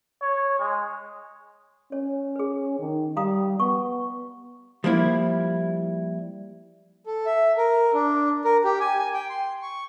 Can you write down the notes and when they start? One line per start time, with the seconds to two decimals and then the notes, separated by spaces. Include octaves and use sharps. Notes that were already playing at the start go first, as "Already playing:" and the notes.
0.22 C#5
0.60 G#3
1.92 C#4 C#5
2.36 G#4 B4
2.79 D#3
3.17 G3 F5 A#5 D#6
3.60 B3 C#6
4.84 F3 G3 A#3 E4
7.06 A4
7.26 E5
7.57 A#4
7.94 D4
8.44 A#4
8.64 G4
8.80 G#5
8.99 G#5
9.13 G5
9.29 C6
9.62 C#6